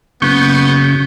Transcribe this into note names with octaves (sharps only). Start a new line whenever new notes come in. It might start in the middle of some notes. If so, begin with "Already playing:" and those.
F#1 C#3 B3 C#6 G6